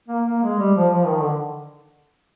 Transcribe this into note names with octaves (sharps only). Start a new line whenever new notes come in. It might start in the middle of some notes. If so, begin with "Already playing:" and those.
A#3
A#3
G#3
G3
F3
F3
D#3
D3